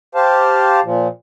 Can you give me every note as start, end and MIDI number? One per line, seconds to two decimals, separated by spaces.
0.15 0.80 67
0.15 0.80 72
0.15 0.80 77
0.15 0.80 81
0.84 1.08 46
0.84 1.08 53